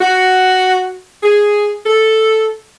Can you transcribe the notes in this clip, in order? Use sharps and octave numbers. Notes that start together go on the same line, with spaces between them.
F#4
G#4
A4